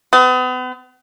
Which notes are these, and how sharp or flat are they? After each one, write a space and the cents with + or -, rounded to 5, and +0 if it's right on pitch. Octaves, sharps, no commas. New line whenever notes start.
B3 +40